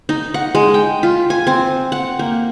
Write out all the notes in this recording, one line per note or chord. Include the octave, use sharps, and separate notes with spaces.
D#4
F#5
G#3
G5
F4
G#5
C4
F#5
A#3